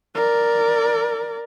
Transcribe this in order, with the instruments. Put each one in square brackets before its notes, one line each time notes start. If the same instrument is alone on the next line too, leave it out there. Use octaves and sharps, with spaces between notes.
[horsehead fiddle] A#4 D5